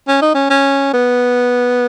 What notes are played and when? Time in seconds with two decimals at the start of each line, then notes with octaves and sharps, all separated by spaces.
0.08 C#4
0.21 D#4
0.35 C#4
0.50 C#4
0.93 B3